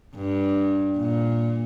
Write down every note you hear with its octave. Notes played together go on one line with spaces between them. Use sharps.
G2
A#2